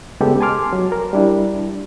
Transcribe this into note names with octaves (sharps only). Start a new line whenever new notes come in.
C#3 G#3 B3 G4 A4
G#5 A5 C6 D6 F6
F#3
A#4
G3 D4 E4